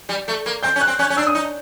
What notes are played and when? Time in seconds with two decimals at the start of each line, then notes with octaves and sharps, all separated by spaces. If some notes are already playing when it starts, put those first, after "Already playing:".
0.09 G3
0.28 A3
0.46 A#3
0.63 C4 G6
0.76 C#4
0.81 F#6
0.87 C4
0.99 C#4 F#6
1.10 C#4
1.17 D4 E6
1.27 D#6
1.35 D#4